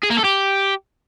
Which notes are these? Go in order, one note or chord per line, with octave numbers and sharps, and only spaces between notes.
G#4
A#3
A4
G4